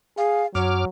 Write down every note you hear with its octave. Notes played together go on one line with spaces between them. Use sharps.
G#4 F5
F#2 F#3 C#5 D6 F6